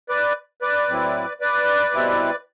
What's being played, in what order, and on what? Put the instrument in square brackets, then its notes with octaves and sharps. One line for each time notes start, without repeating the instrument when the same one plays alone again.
[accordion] B4 D5
B4 D5
A2 F#3 C4 E4
B4 D5
B2 G3 C4 E4